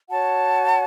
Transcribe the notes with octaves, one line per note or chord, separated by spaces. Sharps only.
F#4 C#5 F#5 A5